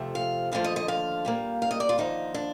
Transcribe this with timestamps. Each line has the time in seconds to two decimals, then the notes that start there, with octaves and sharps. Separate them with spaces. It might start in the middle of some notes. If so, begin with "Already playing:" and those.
Already playing: F2 C3 F3 A3
0.15 F5
0.52 D#2 D3 F3 A3 F5
0.64 D#5
0.76 D#5
0.88 F5
1.25 A#2 G3 A#3
1.62 F5
1.71 D#5
1.80 D5
1.89 F4
1.98 D#2 D3 F3 D#4
2.34 D4